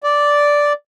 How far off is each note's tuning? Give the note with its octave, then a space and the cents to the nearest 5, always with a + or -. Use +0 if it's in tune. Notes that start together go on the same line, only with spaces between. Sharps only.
D5 -5